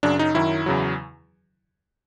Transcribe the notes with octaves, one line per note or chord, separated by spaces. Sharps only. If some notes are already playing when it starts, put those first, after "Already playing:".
F#2 C#3 F#3 D4
D#4
F#2 D#3 F#3 E4
E2 C#3 F#3